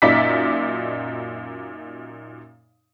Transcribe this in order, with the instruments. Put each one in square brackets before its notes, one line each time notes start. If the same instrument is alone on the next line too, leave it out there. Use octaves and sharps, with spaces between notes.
[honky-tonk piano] F#2 A#2 D#4 D5 E5 B6